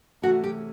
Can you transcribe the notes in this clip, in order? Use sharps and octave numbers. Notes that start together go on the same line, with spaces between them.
C3 E3 A3 C#4 F#4
G4